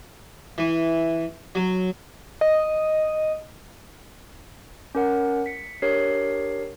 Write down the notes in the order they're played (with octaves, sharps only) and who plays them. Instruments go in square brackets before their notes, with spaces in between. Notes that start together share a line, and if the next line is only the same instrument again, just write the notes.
[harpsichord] E3
F#3
[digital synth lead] D#5
[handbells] C#4 A#4 F#5
B6 C#7
D4 G4 A#4 C#5 C7